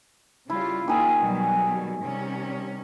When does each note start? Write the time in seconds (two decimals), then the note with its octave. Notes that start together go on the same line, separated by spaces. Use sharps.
0.50 C#3 G3 E4 F4
0.88 D#3 A#3 F4 G#4 E5
1.21 B2 F#3 G3
2.02 C3 G3 C#4